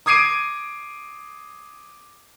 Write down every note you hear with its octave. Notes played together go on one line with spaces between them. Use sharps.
D6 D#6 G#6 C7 D7 D#7